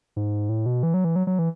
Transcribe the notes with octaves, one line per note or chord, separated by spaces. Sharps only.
G#2
A2
B2
E3
F#3
E3
F#3
F#3
E3